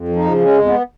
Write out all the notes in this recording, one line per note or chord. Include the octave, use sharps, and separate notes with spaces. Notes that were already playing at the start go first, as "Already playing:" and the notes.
Already playing: F2
F3
D#4
C#3
G#3 C#4
F2
B3